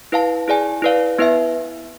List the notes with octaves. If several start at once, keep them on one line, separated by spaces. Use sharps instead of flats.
E4 B4 F5 A5
E4 G#4 D5 G#5
E4 B4 D5 F5
B3 E4 B4 E5